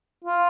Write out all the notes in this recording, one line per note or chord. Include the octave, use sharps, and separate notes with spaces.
F4